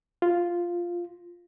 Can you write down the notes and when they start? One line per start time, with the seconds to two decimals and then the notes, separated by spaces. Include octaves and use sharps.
0.22 F4